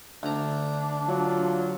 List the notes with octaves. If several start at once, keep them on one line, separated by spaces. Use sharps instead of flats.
D2 D4 A#5
F#3 F4